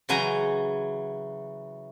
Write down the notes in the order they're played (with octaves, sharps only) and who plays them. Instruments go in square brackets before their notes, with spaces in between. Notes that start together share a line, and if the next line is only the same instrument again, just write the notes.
[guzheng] C#3 E3 F#3 G#5 A#5 C6